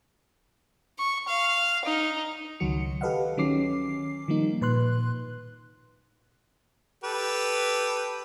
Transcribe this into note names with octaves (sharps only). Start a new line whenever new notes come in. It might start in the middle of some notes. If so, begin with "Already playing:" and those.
C#6
F5
D#4
C#2 D#3 F#3 F#4 C#7
G4 A4 B4 D#5 F5 F#5
D#3 F#3 C#4 D6 C7
D#3 F3 G3 A#3 D#4
A#2 B4 C6 F#6
G4 A4 B4